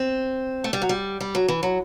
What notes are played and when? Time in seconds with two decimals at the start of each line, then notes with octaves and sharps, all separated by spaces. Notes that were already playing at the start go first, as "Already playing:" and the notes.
Already playing: C4
0.64 A3
0.73 G3
0.82 F#3
0.89 G3
1.21 G3
1.35 F#3
1.48 E3
1.63 F#3